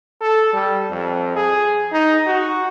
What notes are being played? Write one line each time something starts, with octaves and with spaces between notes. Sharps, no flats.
A4
G3
F2
G#4
D#4
F#4